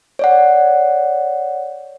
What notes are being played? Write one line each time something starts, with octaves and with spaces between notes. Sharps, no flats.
C#5 D5 F#5